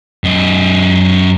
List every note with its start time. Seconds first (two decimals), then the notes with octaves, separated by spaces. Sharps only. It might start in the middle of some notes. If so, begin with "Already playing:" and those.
0.24 F#2 D#5